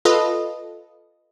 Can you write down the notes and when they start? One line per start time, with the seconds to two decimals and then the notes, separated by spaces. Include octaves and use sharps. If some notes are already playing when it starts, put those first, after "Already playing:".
0.05 F4 A4 B4 D#5